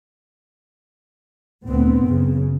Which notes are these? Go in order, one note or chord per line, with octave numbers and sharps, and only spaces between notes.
D2 A#2 B3 C4
F#1 C#3